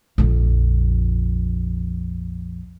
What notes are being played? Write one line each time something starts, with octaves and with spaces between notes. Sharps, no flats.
A#1 F2